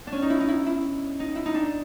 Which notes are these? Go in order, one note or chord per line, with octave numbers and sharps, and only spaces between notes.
D4
C#4
D#4
E4
D#4
E4
E4
D#4
E4
D#4
D4